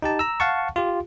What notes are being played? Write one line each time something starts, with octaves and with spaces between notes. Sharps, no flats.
D#4 G4 A5
A#5 E6
F5 F#5 A5 C#6
F4 G4